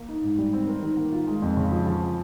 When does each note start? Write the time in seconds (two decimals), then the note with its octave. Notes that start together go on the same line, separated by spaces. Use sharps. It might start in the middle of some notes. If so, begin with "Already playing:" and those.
Already playing: A#3
0.09 D#4
0.23 G#2
0.38 G3
0.53 C4
0.67 A#4
0.82 D#3
0.97 A#3
1.12 F4
1.27 G#3
1.42 F2
1.56 C#3
1.72 F3
1.87 F3
2.01 F3